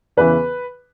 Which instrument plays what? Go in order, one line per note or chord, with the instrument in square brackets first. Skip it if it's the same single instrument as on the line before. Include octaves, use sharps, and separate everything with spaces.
[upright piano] E2 C#3 E3 B4